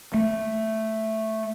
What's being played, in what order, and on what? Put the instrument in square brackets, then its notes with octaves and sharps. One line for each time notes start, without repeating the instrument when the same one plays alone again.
[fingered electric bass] A3